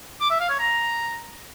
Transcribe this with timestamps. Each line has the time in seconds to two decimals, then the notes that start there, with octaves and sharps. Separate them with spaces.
0.21 D6
0.30 E5
0.40 F5
0.50 C#5
0.59 A#5